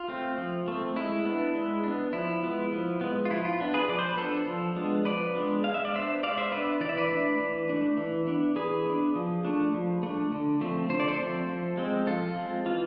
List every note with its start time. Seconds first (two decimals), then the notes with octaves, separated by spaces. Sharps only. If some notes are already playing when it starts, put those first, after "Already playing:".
Already playing: F4
0.08 A3 C4
0.38 F3
0.68 A3 C4
0.96 G#3 E4
1.25 B3 D4
1.55 G#3
1.84 B3 D4
2.13 F3 E4
2.43 G#3 B3
2.72 F3
3.01 G#3 B3
3.25 F4
3.30 F3 E4
3.45 F4
3.60 B3 D4
3.74 G#4 B4
3.89 F3 D5
3.99 C5
4.09 B4
4.17 B3 D4 A4 C5
4.47 F3
4.76 G#3 B3 D4
5.05 F3 B4 D5
5.35 G#3 B3 D4
5.64 G#3 F5
5.74 E5
5.85 D5
5.94 B3 D4 C5 E5
6.23 G#3 D5 F5
6.38 C5 E5
6.52 B3 D4 B4 D5
6.81 E3 D5
6.89 E5
6.97 B4 D5
7.10 A3 D4
7.40 E3
7.69 A3 D4
7.98 E3
8.27 B3 D4
8.56 E3 G#4 B4
8.86 B3 D4
9.16 F3
9.45 A3 D4
9.74 F3
10.03 A3 D4
10.32 D3
10.61 F3 A3 C4
10.90 D3 C5
11.00 D5
11.08 A4 C5
11.20 F3 A3 C4
11.49 F3
11.77 G#3 C4
12.07 F3 F4 A4
12.36 G#3 C4
12.66 E3 F4